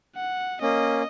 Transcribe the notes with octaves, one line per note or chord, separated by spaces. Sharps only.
F#5
A#3 C#4 D#5